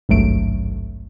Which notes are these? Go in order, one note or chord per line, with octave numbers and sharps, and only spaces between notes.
G#1 C#2 G2 F#3 A3 D7